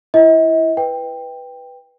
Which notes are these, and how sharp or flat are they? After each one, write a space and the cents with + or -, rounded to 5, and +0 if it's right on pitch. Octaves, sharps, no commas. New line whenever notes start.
E4 +15 D#5 +45
B4 +0 G5 +10